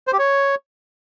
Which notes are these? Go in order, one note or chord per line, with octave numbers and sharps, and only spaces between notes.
C5
G4
C#5